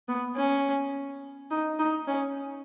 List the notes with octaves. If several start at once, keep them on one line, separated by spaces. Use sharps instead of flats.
B3
C#4
D#4
D#4
C#4